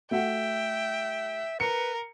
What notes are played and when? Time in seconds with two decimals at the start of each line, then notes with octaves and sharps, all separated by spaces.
0.11 A3 F#4 E5 F#5 G5
1.60 A#4 B4 C#7